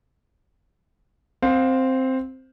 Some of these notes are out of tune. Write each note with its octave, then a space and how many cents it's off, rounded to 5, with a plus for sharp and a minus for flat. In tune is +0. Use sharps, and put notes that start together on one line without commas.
C4 +0 C5 +0 F5 +25